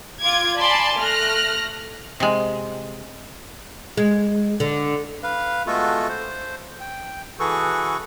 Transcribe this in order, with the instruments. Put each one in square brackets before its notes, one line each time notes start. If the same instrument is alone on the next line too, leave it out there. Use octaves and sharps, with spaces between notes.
[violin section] F4 D6 G#6
D5 G#5 A5 B5 C6
A3 F6 F#6 A#6
[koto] C3 G#3
[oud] G#3
D3
[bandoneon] B4 F5
G#3 A3 B3 F4 F#4 A4
C5
G5
E3 F#4 G#4 A4 B4 C#6